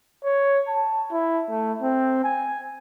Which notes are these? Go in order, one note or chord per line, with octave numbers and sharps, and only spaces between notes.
C#5
A5
E4
A3
C4
G#5